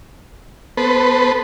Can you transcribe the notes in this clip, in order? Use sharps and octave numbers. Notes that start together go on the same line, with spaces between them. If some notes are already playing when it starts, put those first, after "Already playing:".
B3 A4 B4 C5